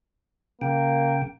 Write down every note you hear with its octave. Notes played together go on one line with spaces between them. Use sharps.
C#3 A#3 G5